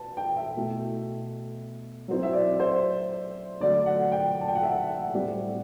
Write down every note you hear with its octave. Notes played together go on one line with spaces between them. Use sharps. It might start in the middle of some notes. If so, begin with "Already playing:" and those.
Already playing: B4 A5
G5
E5
B2 A3 E4
F#3 C4 E4
E5
D5
C5
D3 F#3 A3 D5
F#5
G5
A5
G5
F#5
E5
F#5
A2 G3 C4 E4